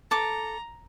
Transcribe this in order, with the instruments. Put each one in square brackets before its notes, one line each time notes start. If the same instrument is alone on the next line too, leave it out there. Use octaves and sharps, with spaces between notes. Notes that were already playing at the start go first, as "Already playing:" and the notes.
[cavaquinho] A4 D6 [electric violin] A#5